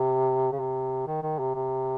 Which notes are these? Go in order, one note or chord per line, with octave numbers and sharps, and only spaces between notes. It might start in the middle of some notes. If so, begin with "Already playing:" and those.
Already playing: C3
C#3
C3
D#3
D#3
C3
C3